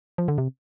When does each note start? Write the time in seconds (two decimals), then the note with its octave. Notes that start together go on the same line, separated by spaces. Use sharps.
0.18 F3
0.28 D3
0.38 C3